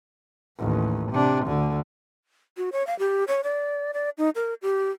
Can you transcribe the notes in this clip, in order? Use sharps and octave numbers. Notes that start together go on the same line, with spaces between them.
A1 D#2
C3 D4
D2 D3
F#4
C#5
F5
G4
C#5
D5
D5
D#4
A#4
G4